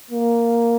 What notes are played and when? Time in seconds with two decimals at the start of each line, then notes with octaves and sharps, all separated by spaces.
0.11 A#3